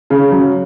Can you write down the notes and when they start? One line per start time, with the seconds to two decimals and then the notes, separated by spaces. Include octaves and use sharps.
0.10 C#3
0.31 F#3